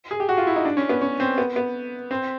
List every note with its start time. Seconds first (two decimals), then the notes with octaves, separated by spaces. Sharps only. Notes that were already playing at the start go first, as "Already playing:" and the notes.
0.11 G#4
0.20 G4
0.29 F#4
0.38 F4
0.47 E4
0.56 D#4
0.65 D4
0.77 C#4
0.89 B3
1.02 C#4
1.20 C4
1.38 B3
1.56 B3
2.11 C4